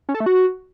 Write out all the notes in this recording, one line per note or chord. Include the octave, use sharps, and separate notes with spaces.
C#4
A4
A3
F#4